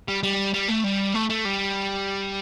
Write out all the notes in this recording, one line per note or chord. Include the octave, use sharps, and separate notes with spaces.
G3
G3
G3
A3
G3
A3
A3
G3